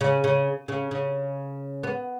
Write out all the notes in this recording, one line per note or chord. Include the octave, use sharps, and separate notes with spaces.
C#3
C#3
C#3
C#3
B3